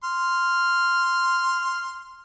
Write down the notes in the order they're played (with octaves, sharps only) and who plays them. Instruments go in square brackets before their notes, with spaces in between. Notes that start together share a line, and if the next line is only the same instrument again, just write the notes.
[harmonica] C6 F6